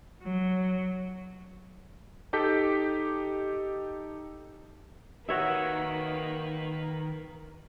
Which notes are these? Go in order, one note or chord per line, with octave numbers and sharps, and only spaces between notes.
F#3
D#4 G4 A4 D6 G6 B6
D#3 A#3 F#4 B4 C#5 E5